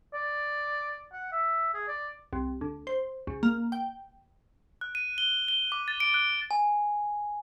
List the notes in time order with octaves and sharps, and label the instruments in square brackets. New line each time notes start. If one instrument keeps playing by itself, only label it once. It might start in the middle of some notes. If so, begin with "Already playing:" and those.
[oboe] D5
F#5
E5
G#4
D5
[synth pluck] C2
D2
C5
C#2
A#3
G5
[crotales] F#6
D#7
G7
G7
D6
A6
D7
F#6
[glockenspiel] G#5